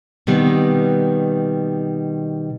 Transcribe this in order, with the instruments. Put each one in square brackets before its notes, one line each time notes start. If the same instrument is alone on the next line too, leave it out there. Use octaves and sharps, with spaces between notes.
[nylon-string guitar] B2 D#3 G3 B3 C4